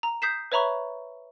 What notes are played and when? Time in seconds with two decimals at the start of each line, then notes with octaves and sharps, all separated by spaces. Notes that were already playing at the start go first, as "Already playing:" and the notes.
0.03 A#5
0.22 D#6 G6 B6 C7 E7
0.52 B4 C#5 E5 A#5 B5 C#6